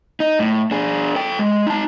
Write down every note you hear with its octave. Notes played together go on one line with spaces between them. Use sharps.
D#4
A2
D4 G#4
A4 G5
G#3
D#4 A5